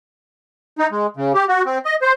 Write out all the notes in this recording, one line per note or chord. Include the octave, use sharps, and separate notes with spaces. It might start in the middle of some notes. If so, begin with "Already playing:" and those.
D#4
G#3
C#3
G4
F#4
C4
D#5
C5